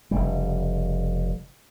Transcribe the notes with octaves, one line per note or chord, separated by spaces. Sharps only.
F1 C#3 G3